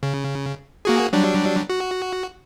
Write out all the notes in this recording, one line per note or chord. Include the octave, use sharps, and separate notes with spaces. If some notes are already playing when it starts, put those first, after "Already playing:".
C#3
A#3 F#4 G#4
F#3 G3 D4
F#4